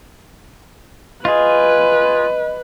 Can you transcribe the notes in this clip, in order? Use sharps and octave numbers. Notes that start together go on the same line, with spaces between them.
F4 G#4 B4 D#5